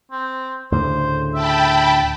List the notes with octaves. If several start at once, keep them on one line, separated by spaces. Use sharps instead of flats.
C4
D2 A2 C#3 C5
E5 G5 A5 B5